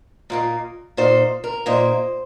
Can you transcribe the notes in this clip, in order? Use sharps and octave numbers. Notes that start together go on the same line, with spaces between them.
A#2 A#3 D#4
A#2 A#3 D#4 C5
A#4
A#2 A#3 D#4 C5